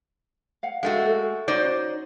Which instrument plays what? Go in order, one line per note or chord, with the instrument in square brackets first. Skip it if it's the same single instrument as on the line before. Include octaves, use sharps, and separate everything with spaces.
[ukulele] F5 F#5
[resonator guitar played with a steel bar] G#3 A3 F#4 [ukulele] F5
[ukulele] A4 F#5
[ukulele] C#4 F#4 [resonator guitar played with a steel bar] D#4 C5 D5